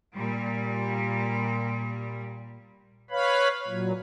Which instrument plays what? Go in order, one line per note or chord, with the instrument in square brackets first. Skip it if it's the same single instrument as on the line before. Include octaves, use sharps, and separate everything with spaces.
[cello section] A#2 G3
[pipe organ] B4 C#5 F5 B5
A#2 F#3